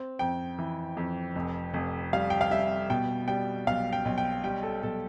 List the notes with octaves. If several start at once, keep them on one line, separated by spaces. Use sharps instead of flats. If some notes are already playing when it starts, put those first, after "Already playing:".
Already playing: C4
F2 G5
E3
F2
F1
F1
G3 F5
G5
F5
G3 E5
B2 G5
G3 G5
B1 F5
G5
B1
G5
G3 G5
A4
B1 A4